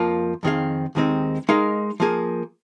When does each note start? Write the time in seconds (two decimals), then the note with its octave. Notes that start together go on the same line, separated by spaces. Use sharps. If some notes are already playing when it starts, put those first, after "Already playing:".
Already playing: F2 F3 A#3 F4
0.43 F2 D#3 C4 G#4 F5
0.95 D#2 D#3 G#3 C4 D#4
1.49 G#3 D#4 A#4 F5
2.00 F3 A#3 G#4